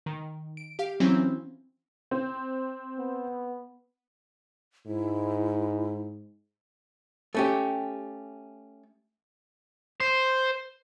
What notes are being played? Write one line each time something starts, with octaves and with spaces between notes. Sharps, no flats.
D#3
D7
G4 F5
E3 F#3 C4 C#4 E4
C4
B3
G#2 E4
A3 C#4 G4
C5